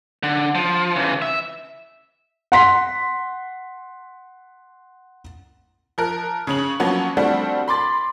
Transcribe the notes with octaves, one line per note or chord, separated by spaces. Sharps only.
D3
F3
C#3 E3
E5
F#5 C6 B6
F3 A#4 F#6
C#3 C#4 F#7
F3 F#3 A#3 B3 C#4
F3 G3 A3 C4 D4 F#4
B5 C6 D6 A6